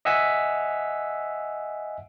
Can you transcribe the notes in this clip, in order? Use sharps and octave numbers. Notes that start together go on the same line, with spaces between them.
D#5 E5 F#5 G#5 E6 B6